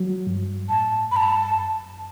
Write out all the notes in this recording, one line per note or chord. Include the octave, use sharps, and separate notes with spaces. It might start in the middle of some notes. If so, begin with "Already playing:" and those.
Already playing: F#3
G2
A2 A5
G2 B5
A5
F#2